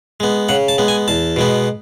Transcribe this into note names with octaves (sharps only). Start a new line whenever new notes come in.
G#3 B3
C#3 F#5
A5
G#3 B3
G#5
E2 A5
B2 G#3 B3